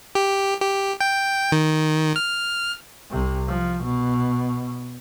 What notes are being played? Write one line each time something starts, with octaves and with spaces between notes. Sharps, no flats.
G4
G4
G5
D#3
F6
C2 C3
F3
B2